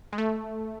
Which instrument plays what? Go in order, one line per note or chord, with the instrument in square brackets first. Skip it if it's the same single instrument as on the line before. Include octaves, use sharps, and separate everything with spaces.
[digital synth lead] G#3
A3